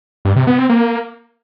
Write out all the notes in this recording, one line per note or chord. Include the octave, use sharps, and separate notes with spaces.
G2
C3
B3
C4
A#3